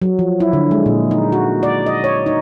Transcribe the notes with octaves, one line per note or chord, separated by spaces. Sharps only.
F#3
F3
E4
D3
G#3
A#2
D#4
F#4
D5
D#5
C#5
D#4